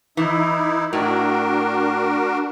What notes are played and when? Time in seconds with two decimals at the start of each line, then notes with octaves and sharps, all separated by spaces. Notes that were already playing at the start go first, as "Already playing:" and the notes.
0.17 E3 D#4 E4
0.93 A2 D4 F#4 A#4